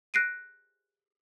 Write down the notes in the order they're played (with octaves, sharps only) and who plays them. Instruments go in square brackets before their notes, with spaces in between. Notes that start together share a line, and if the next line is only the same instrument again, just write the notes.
[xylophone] F#6 A#6 C7 D7 D#7